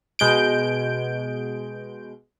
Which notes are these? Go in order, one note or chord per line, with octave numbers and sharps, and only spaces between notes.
B2 G#3 G6 D7